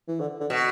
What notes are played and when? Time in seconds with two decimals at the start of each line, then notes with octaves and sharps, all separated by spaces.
0.08 E3
0.20 D3
0.40 D3
0.50 B2